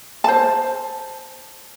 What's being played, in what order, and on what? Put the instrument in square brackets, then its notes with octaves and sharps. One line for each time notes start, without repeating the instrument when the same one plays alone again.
[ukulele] C5 A5